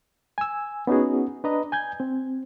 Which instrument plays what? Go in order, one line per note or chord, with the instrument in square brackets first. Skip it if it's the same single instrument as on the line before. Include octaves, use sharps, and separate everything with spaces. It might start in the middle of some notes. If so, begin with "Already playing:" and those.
[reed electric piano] G#5 E6
B3 C#4 D#4 F#4 G#4
D4 B4 D#5 A#5
G#5 G6 G#6
C4